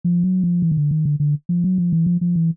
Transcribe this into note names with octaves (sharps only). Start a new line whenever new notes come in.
F3
F#3
F3
E3
D#3
D3
D#3
D3
D3
F3
F#3
F3
E3
F3
F3
E3